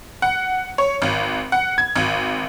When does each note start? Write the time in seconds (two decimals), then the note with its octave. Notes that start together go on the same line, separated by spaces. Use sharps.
0.22 F#5
0.78 C#5
1.02 G#1
1.52 F#5
1.78 G#6
1.96 G#1